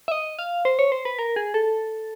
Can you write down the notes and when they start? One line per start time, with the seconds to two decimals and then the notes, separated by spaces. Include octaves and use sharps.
0.08 E5
0.12 D#5
0.39 F5
0.65 C5
0.79 C#5
0.92 C5
1.05 B4
1.19 A#4
1.36 G#4
1.54 A4